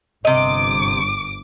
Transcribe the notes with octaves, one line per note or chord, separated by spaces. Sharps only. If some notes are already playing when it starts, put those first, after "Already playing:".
G1 C3 D#5 D6